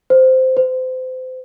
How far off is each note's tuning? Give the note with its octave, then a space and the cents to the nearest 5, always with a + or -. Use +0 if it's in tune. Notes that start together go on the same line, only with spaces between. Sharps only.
C5 -10
C5 -30